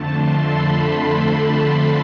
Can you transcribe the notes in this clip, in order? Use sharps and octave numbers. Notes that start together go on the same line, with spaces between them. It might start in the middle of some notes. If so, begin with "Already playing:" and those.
Already playing: F2 D3 A3 A5
C6
B5